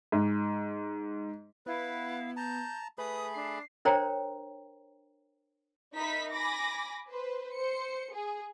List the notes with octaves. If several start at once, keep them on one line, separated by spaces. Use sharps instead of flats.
G#2
B3 E4 B4 F5
A5 A#5 G6
A3 G#4 B4 B5 D#6
D4 C7
D4 A#4 C5 C#5 G5 A#5
D#4 A#4 E5 B5 B6
G#5 B5 D6 A#6
B4 C5
C5 C#7
G#4